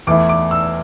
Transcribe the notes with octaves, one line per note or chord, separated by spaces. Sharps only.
E2 E3 A3 E4 D6
D6
E6